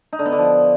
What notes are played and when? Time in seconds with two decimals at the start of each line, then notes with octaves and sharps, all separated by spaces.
0.13 D#4
0.19 D3
0.26 B3
0.32 D3
0.39 F3